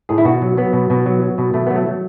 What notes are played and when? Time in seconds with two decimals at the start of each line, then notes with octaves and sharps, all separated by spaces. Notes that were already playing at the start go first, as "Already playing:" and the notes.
0.09 A2 G#4
0.18 E4
0.25 B2 F#4
0.42 F#3
0.57 F#3 B3
0.73 B2
0.90 B2
1.06 F#3
1.22 F#3
1.38 B2
1.54 B2 A3
1.66 F#3 B3
1.76 A3
1.86 F#3